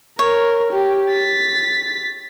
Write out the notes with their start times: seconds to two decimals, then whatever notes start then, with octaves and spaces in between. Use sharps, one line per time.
0.19 A#4 C#5
0.72 G4
1.12 A6 B6